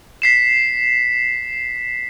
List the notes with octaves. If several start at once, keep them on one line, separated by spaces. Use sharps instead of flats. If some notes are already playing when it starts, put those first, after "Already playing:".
B6 C7 E7